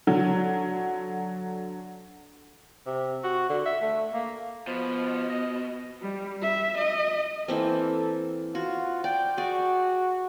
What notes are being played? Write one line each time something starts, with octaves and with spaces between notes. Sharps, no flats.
D3 F#3
C3
F#4
D3
E5
A3
A#3
B2 F3
D#5
G3
E5
D#5
E3 A#3 C4 A4
F4 F#4
D5 G5
F#4 G#4 D5